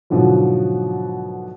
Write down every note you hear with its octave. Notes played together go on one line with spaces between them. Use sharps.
G#2 B2 D3 F3 F#3